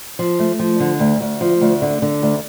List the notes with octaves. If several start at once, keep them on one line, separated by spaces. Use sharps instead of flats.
F3
A3
F3
D3
D2
D2
F3
D2
D3
D3
D2